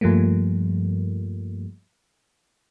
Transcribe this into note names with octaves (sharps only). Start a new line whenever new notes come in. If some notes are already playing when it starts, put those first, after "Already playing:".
G2 F3 G3 A3 A#3